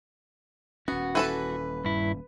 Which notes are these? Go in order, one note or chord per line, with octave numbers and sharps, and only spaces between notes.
D#1 B3 C#4 F#4
E3 A4 B4 A5
G2 E4